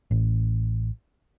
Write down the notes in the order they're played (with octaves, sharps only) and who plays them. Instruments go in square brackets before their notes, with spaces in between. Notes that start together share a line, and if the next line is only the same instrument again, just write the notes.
[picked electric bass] A1